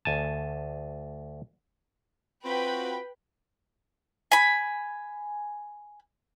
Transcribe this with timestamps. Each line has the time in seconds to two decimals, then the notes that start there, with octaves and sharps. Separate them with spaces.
0.05 D2 G#5 A5
2.45 C4 F4 F#4 B4 G5 B5
4.32 G#5 B5